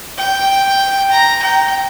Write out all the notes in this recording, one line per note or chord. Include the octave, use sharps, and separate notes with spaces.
G5
A#5
G5